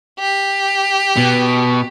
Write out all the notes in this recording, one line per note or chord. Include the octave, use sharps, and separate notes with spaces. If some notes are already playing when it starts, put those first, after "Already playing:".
G4
B2